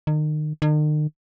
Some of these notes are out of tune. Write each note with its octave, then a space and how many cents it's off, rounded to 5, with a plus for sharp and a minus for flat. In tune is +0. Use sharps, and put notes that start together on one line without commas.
D#3 -35
D#3 -45